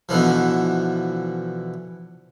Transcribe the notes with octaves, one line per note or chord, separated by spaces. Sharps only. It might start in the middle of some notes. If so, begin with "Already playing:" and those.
B2 D3 E3 F3